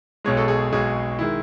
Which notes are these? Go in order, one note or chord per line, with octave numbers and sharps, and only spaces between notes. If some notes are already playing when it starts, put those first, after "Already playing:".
B1 B2 G#3 C#5
A4
G#4
B1 B2 G#3 G#4
D#3 G#3 E4